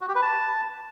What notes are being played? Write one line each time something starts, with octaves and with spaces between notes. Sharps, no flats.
F#4
G4
B4
A5